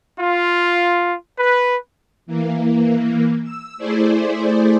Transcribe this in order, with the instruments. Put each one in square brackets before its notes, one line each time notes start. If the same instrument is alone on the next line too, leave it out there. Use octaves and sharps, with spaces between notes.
[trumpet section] F4
B4
[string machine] E3 A#3
E6
A3 E4 G#4 C5 D5